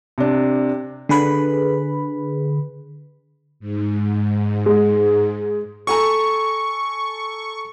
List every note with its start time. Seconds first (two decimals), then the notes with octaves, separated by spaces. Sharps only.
0.18 C3 D4
1.09 D3 G#4 B4 B5
3.60 G#2
4.66 G#3
5.87 A4 G#5 A#5 C#6